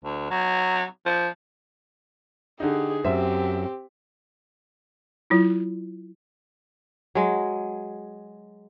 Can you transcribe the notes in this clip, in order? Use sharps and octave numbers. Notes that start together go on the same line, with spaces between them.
D2
F#3
F3
D3 D#4 G4 G#4
F#2 C4 G4 C5 E5
F#3 E4 F4
F#3 G#3